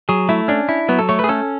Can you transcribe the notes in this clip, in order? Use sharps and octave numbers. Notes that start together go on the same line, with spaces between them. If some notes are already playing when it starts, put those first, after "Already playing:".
F#3 G#4
A3 E4
C#4 D4
E4
F#3 B3
A4
A3 C#5
G#4 B4
C#4 A4